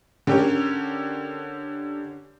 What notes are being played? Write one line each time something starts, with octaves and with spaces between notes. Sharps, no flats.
D3 C#4 G4 A#4 C#5